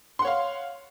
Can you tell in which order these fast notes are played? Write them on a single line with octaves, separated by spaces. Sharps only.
C6 F#5 C#5 F5